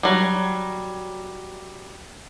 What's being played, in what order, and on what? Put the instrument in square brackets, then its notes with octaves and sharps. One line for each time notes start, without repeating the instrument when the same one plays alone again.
[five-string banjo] F#3 G3